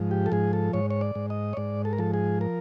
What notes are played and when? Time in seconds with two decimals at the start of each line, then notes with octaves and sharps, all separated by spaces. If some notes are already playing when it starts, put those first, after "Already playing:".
Already playing: G#2 F3
0.11 G4
0.26 A4
0.32 G#2 G#4
0.53 A4
0.73 G#2 C#5
0.90 C#5
1.01 D5
1.15 G#2
1.30 D#5
1.53 C#5
1.57 G#2 D5
1.85 A4
1.93 A#4
1.99 F3 A4
2.14 G#4
2.41 A#4